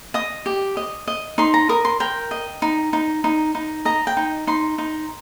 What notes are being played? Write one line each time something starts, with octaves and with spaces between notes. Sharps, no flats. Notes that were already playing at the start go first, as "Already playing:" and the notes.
D#5 D#6
G4
D#5
D#5
D#4 C6
A#5
A#4 D#6
C6
A#4 G5
D#5
D#4
D#4
D#4
D#4
D#5 A#5
G5
D#4
D#4 C6
D#4